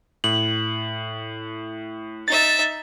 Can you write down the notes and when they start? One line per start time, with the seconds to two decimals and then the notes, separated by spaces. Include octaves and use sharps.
0.24 A2 F#7
2.28 D#4 E5 A6